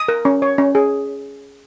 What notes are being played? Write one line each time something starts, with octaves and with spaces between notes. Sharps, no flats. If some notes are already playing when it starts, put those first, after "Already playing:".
Already playing: D#6
A#4
C#4
C#5
C#4
G#4